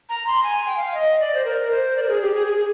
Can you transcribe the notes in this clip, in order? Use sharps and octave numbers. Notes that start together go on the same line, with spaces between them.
A#5
C6
G#5
G5
F5
D#5
D5
C5
A#4
C5
D5
A#4
G#4
G4
G#4
G#4
G#4